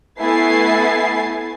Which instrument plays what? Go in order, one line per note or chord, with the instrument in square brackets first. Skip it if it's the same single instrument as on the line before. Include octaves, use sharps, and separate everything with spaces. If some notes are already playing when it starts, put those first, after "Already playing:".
[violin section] A3 B3 E4 G#5 A6 C7